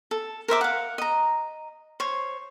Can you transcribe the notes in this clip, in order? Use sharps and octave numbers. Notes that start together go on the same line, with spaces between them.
A4
A#4 C5 E5 D6
F5 F#5
D#5 A#5
C5 C#5